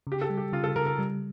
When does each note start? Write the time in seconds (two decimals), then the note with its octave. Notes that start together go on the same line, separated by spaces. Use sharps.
0.07 C#3 G4
0.22 A4
0.30 G3
0.37 G4
0.53 C#3 F4
0.64 A4
0.76 C#3 A#4
0.86 A#4
0.99 G3